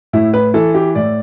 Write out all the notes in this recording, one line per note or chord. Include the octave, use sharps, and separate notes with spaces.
A2 E4
B4
E3 A4
G4
A2 D5